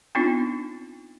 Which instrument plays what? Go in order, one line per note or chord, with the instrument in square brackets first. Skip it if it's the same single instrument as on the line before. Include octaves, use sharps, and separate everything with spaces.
[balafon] B3 C4 D4 D#4 F4